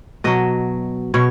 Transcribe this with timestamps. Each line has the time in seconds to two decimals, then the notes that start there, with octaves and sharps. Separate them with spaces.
0.24 B2 F#3 D#5
1.14 B2 C#5